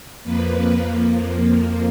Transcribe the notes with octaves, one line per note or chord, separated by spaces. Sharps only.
F2 F3 A#3 B4